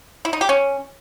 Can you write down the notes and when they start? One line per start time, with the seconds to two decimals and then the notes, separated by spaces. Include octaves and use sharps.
0.25 E4
0.33 D#4
0.41 G4
0.49 C#4